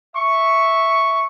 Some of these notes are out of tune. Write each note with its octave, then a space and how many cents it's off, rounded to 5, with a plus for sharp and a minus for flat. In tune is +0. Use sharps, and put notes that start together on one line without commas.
E5 +0 C#6 +0